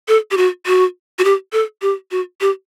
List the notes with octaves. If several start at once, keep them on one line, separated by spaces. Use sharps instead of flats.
A4
G4
F#4
F#4
F#4
G4
A4
G4
F#4
G4